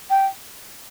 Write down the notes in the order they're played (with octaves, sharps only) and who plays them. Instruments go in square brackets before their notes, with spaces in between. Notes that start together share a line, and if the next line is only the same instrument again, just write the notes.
[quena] G5